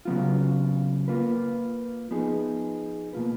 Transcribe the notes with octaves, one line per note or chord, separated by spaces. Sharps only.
C#3 F#3 B3 F4
A#3 F4 B4
F3 B3 D#4 G#4
B2 A#3 F4 B4